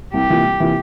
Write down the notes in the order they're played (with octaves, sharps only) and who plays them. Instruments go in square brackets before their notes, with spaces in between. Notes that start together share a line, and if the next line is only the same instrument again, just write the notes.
[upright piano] C2 [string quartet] G4
[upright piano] C3 E3 A#3 F4
C2
C3 E3 A#3 F4